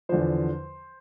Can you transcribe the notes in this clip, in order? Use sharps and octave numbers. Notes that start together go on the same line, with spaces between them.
E2 D3 F3 C5